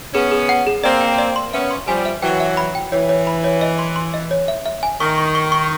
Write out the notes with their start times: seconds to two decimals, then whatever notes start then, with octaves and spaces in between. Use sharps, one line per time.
0.14 B3 C#4 G#4
0.32 G#4
0.49 F#5
0.67 G#4
0.84 A#3 C4 D5
1.01 G5
1.18 D5
1.36 C6
1.53 B3 C#4 E5
1.71 C6
1.87 F3 G3 G#5
2.05 E5
2.22 E3 F#3 G5
2.40 E5
2.57 B5
2.75 G5
2.92 E3 C#5
3.09 C#5
3.27 B5
3.44 C#5
3.61 D#5
3.79 C6
3.96 C6
4.14 D#5
4.31 C#5
4.48 E5
4.66 E5
4.83 G#5
5.00 D#3 C#6
5.18 C#6
5.35 C#6
5.52 C#6